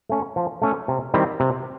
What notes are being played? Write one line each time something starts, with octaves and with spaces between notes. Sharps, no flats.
A3 C#4
F3
A3 C#4
C3
D#3 G3 C4 E4
C3